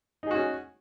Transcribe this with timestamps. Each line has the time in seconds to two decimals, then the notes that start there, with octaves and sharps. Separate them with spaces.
0.23 D#4
0.27 G#4
0.31 F#4
0.35 C#4